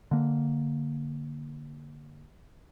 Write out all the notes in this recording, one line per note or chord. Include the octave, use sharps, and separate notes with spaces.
D3 A#3